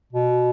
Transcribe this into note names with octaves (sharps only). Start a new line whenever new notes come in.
B2